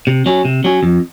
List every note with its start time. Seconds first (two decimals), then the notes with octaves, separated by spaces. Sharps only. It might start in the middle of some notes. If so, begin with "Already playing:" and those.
0.07 C3
0.26 F#3 C#4
0.45 C3
0.64 F#3 C#4
0.83 F2